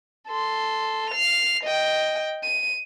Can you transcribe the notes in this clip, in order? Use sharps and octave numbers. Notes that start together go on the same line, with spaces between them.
A4 C6
C7 F7
D#5 G5
D#7